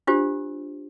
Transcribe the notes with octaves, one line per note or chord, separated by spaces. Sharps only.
D4 F4 G4 C5